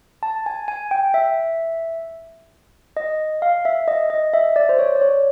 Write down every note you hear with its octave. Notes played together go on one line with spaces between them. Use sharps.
A5
G#5
G#5
G5
E5
D#5
F5
E5
D#5
D#5
E5
D5
C5
C#5
D5
C#5